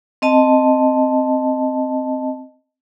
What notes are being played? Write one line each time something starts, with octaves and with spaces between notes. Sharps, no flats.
C4 D#5 A5